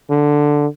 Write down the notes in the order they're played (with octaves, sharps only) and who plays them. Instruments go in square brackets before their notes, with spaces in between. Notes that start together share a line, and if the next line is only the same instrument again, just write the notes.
[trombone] D3